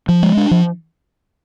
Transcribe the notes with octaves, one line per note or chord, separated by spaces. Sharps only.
F3
G#3
D4
F3